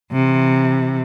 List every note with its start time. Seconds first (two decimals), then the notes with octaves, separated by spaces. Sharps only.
0.13 C3 E3